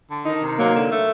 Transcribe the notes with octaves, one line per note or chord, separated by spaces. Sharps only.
D3
D#3 D#4
C3
F#3 A#3
D3
A3